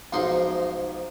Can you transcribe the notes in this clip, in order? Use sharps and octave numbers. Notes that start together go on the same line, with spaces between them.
B1 G#2 F3 D#4 C6